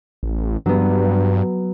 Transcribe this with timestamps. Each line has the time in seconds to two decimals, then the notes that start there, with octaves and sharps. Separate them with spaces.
0.23 A1
0.66 G2 F#3 B3